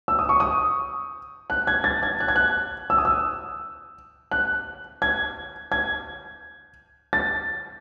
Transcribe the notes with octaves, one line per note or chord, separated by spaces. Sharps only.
E6
D#6
C#6
D#6
F#6
G#6
A6
G#6
F#6
G#6
F#6
E6
D#6
E6
F#6
G#6
G#6
A6